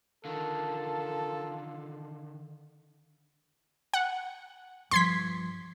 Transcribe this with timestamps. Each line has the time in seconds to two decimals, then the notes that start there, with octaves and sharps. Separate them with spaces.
0.25 D3 D#3 F4 A4 A#4 A5
3.94 F#5
4.91 G2 F3 C6 G#6 B6